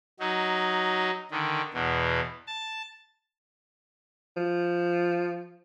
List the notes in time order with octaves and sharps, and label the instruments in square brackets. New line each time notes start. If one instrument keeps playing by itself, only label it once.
[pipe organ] F#3 D#4
D3 D#3
E2 B2
A5
[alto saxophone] F3